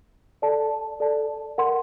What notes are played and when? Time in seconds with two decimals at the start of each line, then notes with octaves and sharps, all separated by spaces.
0.42 A4 D5 A5
1.00 A4 D5 A5
1.58 A#4 F#5 C6